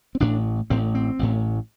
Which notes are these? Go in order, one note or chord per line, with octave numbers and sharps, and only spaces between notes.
C4
A1 A2 D4
A1 A2 C4
C4
A1 A2